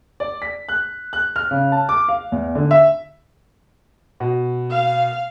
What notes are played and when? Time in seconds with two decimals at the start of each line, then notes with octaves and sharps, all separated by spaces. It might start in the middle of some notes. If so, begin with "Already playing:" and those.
0.20 D5
0.42 B6
0.69 F#6
1.13 F#6
1.36 F6
1.51 C#3
1.72 A5
1.89 D6
2.08 F5
2.32 E2
2.55 D3
2.71 E5
4.20 B2
4.71 F5